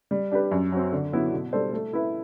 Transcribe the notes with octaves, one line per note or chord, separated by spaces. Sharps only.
G3
D4 G4 B4
F#2
F#3 C4
D3
F#3 B3 E4
B2
G3 D4 A4 C5
A3
E4 B4 E5